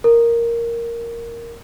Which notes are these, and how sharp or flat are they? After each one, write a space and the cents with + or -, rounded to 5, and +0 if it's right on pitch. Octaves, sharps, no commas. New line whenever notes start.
A#4 +0